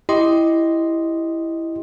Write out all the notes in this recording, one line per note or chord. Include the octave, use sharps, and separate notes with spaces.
E4 G4 D#5 C6